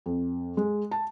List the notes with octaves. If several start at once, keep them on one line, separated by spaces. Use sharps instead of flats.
F2
G#3
A5